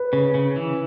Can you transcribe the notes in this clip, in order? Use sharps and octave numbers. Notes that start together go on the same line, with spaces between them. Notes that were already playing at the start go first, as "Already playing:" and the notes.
Already playing: B4
C#3
C#3
E3